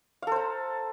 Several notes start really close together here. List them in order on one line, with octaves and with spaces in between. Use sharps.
F5 A4 C5 A#5